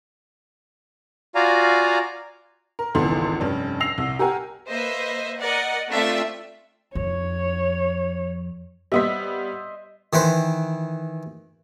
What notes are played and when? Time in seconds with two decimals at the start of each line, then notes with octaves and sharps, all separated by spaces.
1.35 F4 F#4 D5 F5 G#5 A#5
2.79 A#4
2.95 G#1 C#2 E3 B3 A4 C6
3.40 F1 G2 C#4
3.80 E6 A#6 C7 F7
3.98 C2
4.19 G4 A#4 F#5 G#5
4.67 A#3 B4 C5 D#5 E5
5.39 A#4 D5 D#5 F#5
5.90 A3 C4 D4 F4 E5 B6
6.95 F2 C#5
8.92 G3 B3 C5 D#5 E5 B6
10.13 D#3 E3 B4 C5